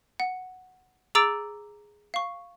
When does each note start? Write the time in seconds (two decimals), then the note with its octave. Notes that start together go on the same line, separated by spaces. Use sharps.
0.20 F#5
1.15 G#4 A#5 D6 E6 A6 D7
2.14 F5 C#6